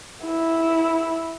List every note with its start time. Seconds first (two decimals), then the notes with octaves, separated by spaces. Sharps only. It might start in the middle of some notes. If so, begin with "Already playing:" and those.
0.25 E4